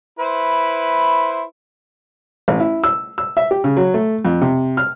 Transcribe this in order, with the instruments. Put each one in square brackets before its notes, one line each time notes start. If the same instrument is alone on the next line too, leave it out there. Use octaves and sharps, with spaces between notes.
[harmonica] E4 B4 C5
[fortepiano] A1
E4
E6
E6
E5
G4
C#3
F#3
A3
F2
C3
F6